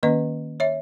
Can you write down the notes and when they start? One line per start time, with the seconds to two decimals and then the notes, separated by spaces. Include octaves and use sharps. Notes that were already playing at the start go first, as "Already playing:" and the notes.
0.03 D#3 A#3 C#4 B4 D#5
0.60 C#5 E5